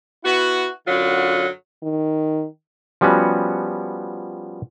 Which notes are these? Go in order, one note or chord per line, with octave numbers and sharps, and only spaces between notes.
B3 E4 F#4
F#2 D3 F#3 F4 F#5
D#3
F3 G3 B3 C#4 F#4